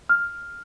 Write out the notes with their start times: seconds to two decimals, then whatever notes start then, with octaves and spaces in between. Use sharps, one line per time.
0.09 F6